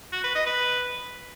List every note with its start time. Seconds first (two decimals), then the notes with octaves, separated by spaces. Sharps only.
0.12 F#4
0.24 B4
0.35 D#5
0.46 B4